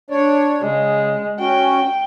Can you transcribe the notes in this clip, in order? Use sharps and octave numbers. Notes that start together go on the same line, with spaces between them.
D4 C#5 D5
C#3 G#3
C#4 F#4 G5